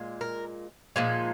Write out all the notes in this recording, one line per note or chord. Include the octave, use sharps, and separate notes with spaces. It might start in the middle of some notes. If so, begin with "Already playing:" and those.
Already playing: A#2 G#3
A#4
A#2 F3 G#3 D#4